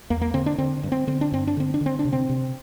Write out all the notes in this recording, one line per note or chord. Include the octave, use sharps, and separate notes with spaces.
E2 A#3
A#3
D3 C4
D4
D3 C4
G2
C4
D3 C4
D4
G2 C4
D4
D3 C4
D4
D3
C4
D4
C3
C4
C3